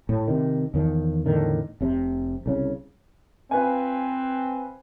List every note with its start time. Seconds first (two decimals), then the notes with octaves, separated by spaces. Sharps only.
0.09 A2
0.27 C3 D#3
0.74 E2 D#3 F3
1.26 E2 A2 D3 D#3
1.81 F1 C3
2.46 C2 C#3
3.51 C4 F4 B4 G#5